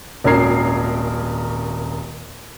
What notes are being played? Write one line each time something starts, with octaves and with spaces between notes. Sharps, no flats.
D#1 G#1 C#4 A#4 G#6 C7